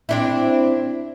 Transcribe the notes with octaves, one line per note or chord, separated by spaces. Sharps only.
C4 D4 E4